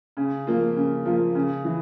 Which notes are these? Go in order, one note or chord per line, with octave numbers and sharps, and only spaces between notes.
C#3
F3 A#3 F4
C#3
F3 A#3 F4
C#3
E3